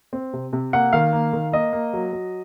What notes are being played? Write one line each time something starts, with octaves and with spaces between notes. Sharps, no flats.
C4
C3
C3
A#3 F#5
D#3 F5
A#3
D#3
A#3 D#5
A#3
F#3
F#3